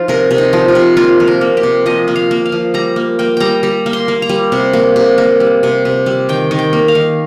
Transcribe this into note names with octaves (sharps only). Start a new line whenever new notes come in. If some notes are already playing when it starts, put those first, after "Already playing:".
Already playing: F3 D#4 F4
C3 A#4
C3
D#4
F3
F4
C3
A#3 F4
F3
A#4
A#3
G4
C3
F3 D#5
A#3
F5
A#3
F5
F3
G3 A#5
A#3
A#3 G5
G3 G5 A#5
G3 A#5
A#3
C6
A#3
A#5
G3
C3
A#3
C3
A#3
G3
C3
C3
G3
D#3 G5
D#3
G5
A#3
F5
D#3